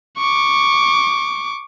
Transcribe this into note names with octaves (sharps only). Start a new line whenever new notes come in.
C#6 D6